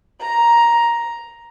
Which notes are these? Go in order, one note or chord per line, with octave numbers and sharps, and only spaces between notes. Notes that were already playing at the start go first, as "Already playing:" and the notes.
A#5